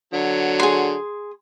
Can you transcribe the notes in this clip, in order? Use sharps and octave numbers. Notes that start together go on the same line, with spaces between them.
D3 F#3
G#4 C6